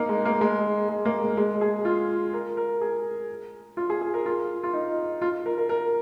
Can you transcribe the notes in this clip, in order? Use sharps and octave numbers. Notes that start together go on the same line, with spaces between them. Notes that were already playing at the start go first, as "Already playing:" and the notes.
Already playing: A#3 D#4
G#3
A#3
G#3
G#3
A#3
G#3
G#3
G#4
F4
A#4
A#4
G#4
F4
G#4
G#4
A#4
F4
F4
D#4
F4
A#4
A#4
A#4